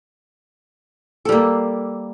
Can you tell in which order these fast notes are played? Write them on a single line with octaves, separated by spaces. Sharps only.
A4 G3 A#3